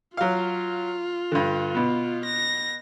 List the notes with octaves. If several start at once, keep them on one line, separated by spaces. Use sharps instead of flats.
F#3 F4 F5
G2 D3
B2 B3
A#6